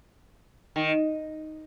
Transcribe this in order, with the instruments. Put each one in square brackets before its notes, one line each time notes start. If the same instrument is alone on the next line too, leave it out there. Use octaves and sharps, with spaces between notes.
[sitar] D#3